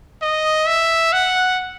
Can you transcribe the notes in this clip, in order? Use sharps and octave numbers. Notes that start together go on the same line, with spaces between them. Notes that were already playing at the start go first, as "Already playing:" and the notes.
D#5
E5
F#5